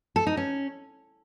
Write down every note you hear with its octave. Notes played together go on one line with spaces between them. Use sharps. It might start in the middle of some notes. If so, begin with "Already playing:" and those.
A4
D#4
C#4